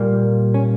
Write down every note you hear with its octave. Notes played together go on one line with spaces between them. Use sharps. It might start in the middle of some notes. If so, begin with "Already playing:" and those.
Already playing: A#2 G3 A#3
C#4